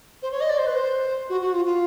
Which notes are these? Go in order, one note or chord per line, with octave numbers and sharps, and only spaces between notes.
C5
C#5
D#5
D5
C5
B4
C5
F#4
F#4
F4
F4